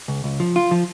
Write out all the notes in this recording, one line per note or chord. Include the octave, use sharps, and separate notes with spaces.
C#2
C#2
F3
F4
F3